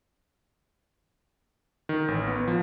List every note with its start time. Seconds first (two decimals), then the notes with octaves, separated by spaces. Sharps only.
1.89 D#3
2.08 A1
2.27 B3
2.48 F3